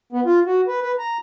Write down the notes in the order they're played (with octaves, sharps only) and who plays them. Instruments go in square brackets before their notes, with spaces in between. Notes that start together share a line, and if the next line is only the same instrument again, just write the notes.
[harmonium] B3
F4
F#4
B4
B4
A#5